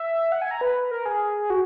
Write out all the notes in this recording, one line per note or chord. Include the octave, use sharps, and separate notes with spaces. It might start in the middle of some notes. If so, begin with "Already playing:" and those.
Already playing: E5
F#5
G#5
A#5
B4
A#4
G#4
F#4